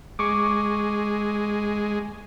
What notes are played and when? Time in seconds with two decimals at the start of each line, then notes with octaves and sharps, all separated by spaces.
0.19 G#3 C#6 D6